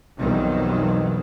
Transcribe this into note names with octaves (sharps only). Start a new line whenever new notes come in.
B1 F2 D#3 E3 F#3 G3